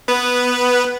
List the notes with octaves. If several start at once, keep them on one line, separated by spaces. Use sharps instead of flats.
B3 B4